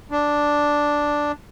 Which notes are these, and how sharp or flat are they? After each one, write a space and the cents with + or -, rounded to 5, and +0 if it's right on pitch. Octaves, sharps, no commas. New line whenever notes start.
D4 +0